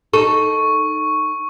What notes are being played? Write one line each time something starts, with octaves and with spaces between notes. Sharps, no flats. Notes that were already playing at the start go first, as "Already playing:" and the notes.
D#4 A4 C#6